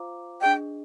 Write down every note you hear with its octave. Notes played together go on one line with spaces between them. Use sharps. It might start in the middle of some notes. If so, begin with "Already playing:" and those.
Already playing: F4 C5 F5 A#5 D6
D4 G#4 D#5 G5